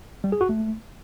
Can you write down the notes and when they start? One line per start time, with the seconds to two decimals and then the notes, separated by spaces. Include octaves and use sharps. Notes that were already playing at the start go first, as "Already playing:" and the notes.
0.24 G3
0.32 G#4
0.41 F#4
0.49 A3